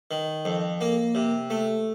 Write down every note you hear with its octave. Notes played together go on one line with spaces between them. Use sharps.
D#3
F2
A#3
C3
A3